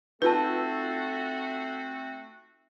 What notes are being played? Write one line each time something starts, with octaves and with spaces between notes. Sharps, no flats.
A3 C4 D#4 F4 F#4 A4 B4 A5